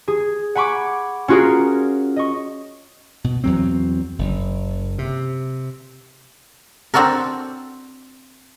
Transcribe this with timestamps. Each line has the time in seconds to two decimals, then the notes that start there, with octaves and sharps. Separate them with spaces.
0.08 G#4
0.55 F#5 G#5 B5 C#6 D6
1.28 C#4 F4 F#4 G#4 A#4
2.16 D#5 C#6
3.24 B2
3.44 E2 F#3 C4
4.19 F#1
4.98 C3
6.94 C4 D4 F#4 A4 A#4